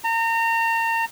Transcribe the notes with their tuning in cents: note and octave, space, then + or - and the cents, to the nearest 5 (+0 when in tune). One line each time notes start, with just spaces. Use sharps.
A#5 -35